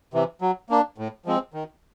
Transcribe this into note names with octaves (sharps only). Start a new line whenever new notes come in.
C3 E3
F#3
A#3 D4
A2
F3 G#3 C4
D#3